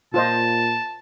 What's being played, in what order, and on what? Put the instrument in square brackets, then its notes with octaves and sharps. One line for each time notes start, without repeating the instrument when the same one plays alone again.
[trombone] A#2 [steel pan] F4 C5 D#5 [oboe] A5